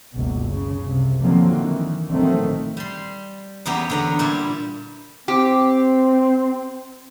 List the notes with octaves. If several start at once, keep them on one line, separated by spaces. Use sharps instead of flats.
F#1 C#2 B2
C#3
C2 C3
D3 D#3 F3 F#3 A#3 C4
D#3 E3
A#1 D#3 F#3 A3 C4
G3 C6
E2 C#3 B3 G4 A#5
D3 B3 A#5
A#2 G3 E4
C4 G4